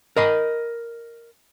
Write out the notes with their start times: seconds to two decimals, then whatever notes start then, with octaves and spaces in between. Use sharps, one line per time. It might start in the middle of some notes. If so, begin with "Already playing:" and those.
0.17 A#4 D#5 B5